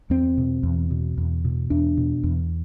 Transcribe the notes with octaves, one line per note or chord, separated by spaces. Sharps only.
E2 C4
B2
E2
B2
E2
B2
E2 D4
B2
E2